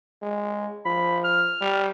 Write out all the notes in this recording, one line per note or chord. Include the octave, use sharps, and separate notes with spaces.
G#3
F3 B5
F6
G3